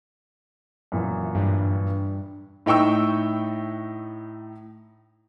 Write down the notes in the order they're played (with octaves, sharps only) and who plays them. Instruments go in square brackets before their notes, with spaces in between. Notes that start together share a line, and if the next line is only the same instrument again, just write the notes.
[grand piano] F#2 A#2 E3
[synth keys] G2
[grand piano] A2 D#4 G5 C#6 E6